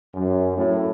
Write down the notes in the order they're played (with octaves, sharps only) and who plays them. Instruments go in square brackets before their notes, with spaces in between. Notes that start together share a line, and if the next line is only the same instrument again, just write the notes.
[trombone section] F#2
A2